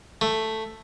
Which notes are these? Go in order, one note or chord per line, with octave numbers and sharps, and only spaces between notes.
A3